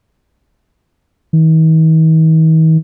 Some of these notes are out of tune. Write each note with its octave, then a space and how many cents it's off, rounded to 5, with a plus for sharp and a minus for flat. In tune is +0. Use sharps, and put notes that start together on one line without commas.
D#3 +45